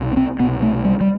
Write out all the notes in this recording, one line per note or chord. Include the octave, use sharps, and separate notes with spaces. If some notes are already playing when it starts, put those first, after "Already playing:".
Already playing: C2 B2
B3
C4
C2 B2 B3
A3
G3
G3